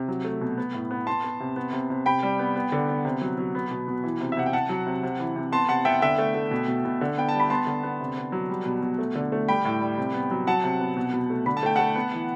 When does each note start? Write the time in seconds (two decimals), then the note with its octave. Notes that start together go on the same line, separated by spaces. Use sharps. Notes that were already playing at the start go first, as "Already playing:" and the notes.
Already playing: C3
0.08 F#3
0.24 A3
0.41 B2
0.58 B3
0.74 A2
0.91 B3
1.07 B3 A5 C6
1.23 B3
1.40 C3
1.56 B3
1.73 C3
1.90 C3
2.06 C3 G5 B5
2.23 G3
2.39 B3
2.56 B3
2.72 D3
2.89 B3
3.05 C3
3.21 F#3
3.38 F#3
3.55 B3
3.71 B2
3.88 B2
4.04 E3
4.21 C3
4.32 E5
4.37 C3 F#5
4.46 G5
4.53 C3 F#5 A5
4.69 F#3
4.87 C3
5.03 C3
5.20 E3
5.36 C3
5.52 B3 A5 C6
5.69 C3 F#5 A5
5.85 B3 E5 G5
6.02 D3 E5 G5
6.18 A3
6.35 A3
6.51 B2
6.68 B2
6.85 B2
7.01 D3
7.17 B3 G5
7.28 A5
7.34 G3
7.40 B5
7.50 B3 A5 C6
7.67 D3
7.83 B3
8.00 C3
8.17 B3
8.32 F#3
8.49 G3
8.66 B2
8.82 B2
8.99 A3
9.15 D3
9.32 A3
9.48 G3 G5 B5
9.65 A2
9.81 G3
9.98 C3
10.14 B3
10.31 F#3
10.47 F#3 F#5 A5
10.64 C3
10.80 B3
10.97 B2
11.14 B2
11.30 A3
11.46 D3 B5
11.57 A5
11.63 A3 G5
11.76 A3 F#5 A5
11.96 B3
12.13 E3